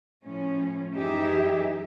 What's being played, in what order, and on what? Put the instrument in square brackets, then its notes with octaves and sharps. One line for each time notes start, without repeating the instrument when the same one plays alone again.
[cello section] A2 F3 C#4
F#2 E3 D#4 G4 G#4 E5